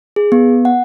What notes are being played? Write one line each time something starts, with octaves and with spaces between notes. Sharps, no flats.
G#4
B3
F#5